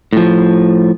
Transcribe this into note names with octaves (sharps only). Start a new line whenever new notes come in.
A2 F3